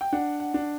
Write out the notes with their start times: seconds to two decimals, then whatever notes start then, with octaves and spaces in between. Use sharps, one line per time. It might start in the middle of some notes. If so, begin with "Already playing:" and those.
0.01 G5
0.12 D4 F#5
0.40 F#5
0.54 D4